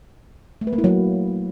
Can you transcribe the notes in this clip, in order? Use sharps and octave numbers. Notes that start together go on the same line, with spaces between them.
A3
B4
A#3
E4
F#3